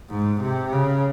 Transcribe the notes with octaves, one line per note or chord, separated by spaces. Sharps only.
G#2
C3
C#3